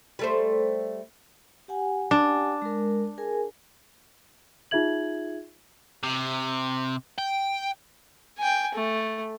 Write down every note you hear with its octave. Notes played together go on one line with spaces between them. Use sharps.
G3 A3 C5
G4 F#5 G#5
D4
G#3 A#4
G#4 A#4 G#5
D#4 F4 G#4 E5 G#6 F#7
C3
G5
G5 G#5
A3